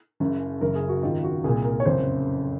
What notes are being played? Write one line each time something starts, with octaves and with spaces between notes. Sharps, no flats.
F#1 F#2 C#3
F#1 F#2 C#3 A#4
G#4
F#4
G#1 G#2 D#3 F4
F#4
C2 A#2 G#4
A#4
C#5
F#1 F2 C#3 C5